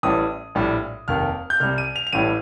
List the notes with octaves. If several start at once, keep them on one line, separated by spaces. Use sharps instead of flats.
A1 A2 G3 D#6
A#1 A2 G3
F1 D#2 D#3 F6
G6
C2 C3 G3 F6
D#7
F7
F7
A1 A2 G3 D#7